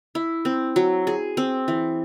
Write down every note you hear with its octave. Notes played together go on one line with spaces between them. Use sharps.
E4
C4
F#3
G#4
C4
E3